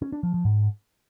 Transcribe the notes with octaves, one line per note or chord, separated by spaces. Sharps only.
C#4
D4
F3
F3
G#2